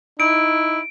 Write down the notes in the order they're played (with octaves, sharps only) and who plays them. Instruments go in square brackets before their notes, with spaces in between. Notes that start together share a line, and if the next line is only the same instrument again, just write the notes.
[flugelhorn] D#4 [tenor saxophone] E4 [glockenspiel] D7